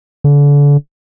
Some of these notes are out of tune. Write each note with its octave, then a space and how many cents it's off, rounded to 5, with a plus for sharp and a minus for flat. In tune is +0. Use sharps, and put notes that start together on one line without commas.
D3 -35